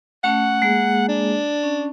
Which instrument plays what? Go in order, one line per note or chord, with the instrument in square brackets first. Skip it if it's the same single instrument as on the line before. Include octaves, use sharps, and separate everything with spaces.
[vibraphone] A3 C#4 A5 [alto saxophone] F#5
[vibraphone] G#3 A#3 G#4
[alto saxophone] D4
[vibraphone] C#4